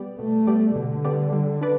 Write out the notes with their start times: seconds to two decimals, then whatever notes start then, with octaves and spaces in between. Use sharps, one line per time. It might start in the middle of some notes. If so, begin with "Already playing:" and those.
Already playing: B2 G3 B3 G4 D5
0.19 B2 A3
0.47 G3 B3 G4 D5
0.76 B2 D3
1.05 G3 B3 G4 D5
1.33 G3
1.61 D4 B4 D5